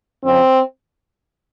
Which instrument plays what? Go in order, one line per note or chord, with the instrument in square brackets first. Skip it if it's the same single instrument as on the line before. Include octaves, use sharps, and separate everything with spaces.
[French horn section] F2 C#3 F3 C4